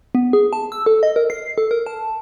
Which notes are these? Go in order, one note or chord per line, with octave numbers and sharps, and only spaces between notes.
B3
G#4
A5
E6
A4
D#5
A#4
C7
A4
A#4
A5